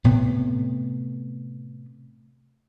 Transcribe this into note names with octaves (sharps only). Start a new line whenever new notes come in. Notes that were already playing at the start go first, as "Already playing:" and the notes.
A2 C3 B3